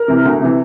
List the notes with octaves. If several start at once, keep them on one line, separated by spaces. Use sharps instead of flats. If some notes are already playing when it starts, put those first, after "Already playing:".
Already playing: A#4
C3 E3
D2
C3 E3